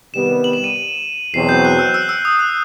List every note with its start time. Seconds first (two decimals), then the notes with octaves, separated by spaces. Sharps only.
0.14 C3 D#3 G3 B3 E7
0.44 F#7
0.53 E7
0.64 D#7
1.34 E2 B2 F#3 C4 C7
1.49 G6
1.65 F#6
1.79 E6
1.94 E6
2.09 E6
2.25 D#6
2.39 F#6